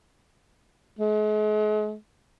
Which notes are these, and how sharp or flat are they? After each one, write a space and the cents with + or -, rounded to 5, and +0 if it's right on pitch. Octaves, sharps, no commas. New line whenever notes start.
G#3 +40